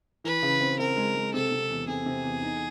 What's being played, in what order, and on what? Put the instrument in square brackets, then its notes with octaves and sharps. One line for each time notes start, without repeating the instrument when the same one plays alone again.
[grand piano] E3 [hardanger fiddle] B4
[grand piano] C#3
C4
[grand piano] C4 [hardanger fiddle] A#4
[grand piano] G#3
G#3
[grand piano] C3 [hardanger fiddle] A4
[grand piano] C3
E2
[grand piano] C3 [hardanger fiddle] G#4
[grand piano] C3
E2
D#4